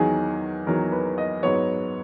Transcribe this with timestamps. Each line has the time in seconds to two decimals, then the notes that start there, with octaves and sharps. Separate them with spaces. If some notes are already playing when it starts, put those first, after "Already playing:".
Already playing: E2 D#3 F#3 G#4
0.67 E2 D#3 F#3 A#4
0.92 B4
1.18 D#5
1.43 G#2 F#3 B3 C#5